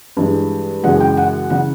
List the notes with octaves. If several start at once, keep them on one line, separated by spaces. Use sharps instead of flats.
G2 E3 G#3
F#2 C#3 E3 G#3 F#5
G5
F#5
C#3 E3 F#5